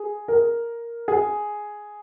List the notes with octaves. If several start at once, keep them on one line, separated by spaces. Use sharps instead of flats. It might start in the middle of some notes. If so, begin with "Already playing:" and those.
Already playing: G#4
A#4
G#4